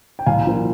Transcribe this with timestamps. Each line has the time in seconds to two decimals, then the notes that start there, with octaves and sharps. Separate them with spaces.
0.19 G5
0.26 C2 F5 G#5
0.46 A#2 F3 A#3